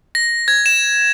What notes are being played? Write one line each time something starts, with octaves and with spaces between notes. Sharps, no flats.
A#6
G#6
E7